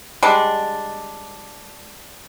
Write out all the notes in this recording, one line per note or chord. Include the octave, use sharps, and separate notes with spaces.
G3 G#3 D4